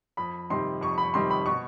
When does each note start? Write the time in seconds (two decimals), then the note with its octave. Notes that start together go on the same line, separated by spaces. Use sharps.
0.17 F2 B5
0.50 C3 D#3 G3 C6
0.81 F2 C#6
0.98 B5
1.14 C3 D#3 G3 C6
1.30 B5
1.46 B2 C#6